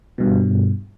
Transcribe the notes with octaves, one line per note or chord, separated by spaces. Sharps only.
G2 B2